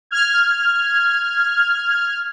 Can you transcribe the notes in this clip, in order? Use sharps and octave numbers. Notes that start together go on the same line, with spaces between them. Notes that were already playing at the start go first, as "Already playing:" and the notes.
F6 G#6